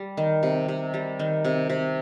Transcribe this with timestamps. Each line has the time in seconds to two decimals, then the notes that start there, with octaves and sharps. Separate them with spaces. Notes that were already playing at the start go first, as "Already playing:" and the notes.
Already playing: G3
0.17 D#3
0.43 C3
0.68 C3
0.94 G3
1.19 D#3
1.45 C3
1.70 C3